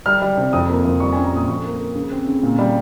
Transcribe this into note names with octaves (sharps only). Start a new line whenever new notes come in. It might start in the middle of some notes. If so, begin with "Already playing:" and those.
G3 F6
G3
C3
F2 D#6
A#3
F2
G3 C#6
C#4 G#5
A#5
A#2 D#6
F2 C#6
A#3
A#3
C#3
C4
C#3
A#2
G3